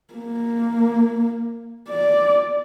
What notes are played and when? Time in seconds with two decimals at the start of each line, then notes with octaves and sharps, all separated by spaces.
0.14 A#3
1.89 D5